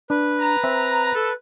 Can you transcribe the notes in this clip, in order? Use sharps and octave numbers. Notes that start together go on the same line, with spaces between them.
D4 B4
A#5
C4 E5
A4